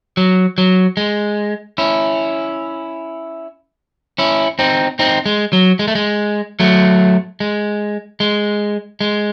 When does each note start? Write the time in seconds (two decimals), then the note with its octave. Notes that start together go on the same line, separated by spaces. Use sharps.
0.17 F#3
0.58 F#3
0.97 G#3
1.78 C#4 E4
4.18 C#4 E4
4.59 C4 D#4
4.99 C4 D#4
5.26 G#3
5.53 F#3
5.79 G#3
5.88 A3
5.95 G#3
6.60 F#3 A3
7.40 G#3
8.20 G#3
9.01 G#3